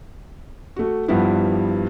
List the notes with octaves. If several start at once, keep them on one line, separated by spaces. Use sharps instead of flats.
A3 F#4
G2 F3 G3 B3 E4